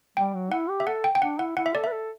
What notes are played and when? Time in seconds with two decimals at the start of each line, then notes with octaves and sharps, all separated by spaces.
0.17 G3 G5
0.34 F#3
0.52 E4 F#5
0.69 G4
0.80 E5
0.87 A4 F#5
1.04 G5
1.15 G5
1.22 D4 F#5
1.39 E4 F#5
1.57 E4 F#5
1.66 E5
1.74 A4 D5
1.84 B4 E5
1.92 A4